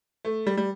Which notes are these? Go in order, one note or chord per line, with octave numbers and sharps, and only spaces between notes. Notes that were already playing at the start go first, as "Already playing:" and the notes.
A3
G3
G3